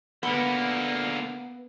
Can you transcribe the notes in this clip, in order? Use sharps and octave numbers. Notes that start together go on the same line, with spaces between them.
D3 A#3 B3